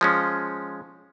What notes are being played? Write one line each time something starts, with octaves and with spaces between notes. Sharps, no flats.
F3 G#3 C#4